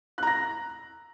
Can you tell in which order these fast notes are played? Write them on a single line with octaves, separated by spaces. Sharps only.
F#6 A#5 A#6